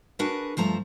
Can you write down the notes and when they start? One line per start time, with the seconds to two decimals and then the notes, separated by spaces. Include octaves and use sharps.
0.19 D4 F#4 G#4 A#4 B4
0.57 G2 F3 A3 A#5